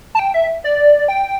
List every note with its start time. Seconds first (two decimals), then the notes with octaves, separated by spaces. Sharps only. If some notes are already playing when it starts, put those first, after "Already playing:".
0.15 A5
0.19 G5
0.34 E5
0.64 D5
1.08 G5